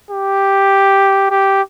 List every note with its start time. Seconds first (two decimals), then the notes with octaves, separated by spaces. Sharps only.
0.10 G4
1.30 G4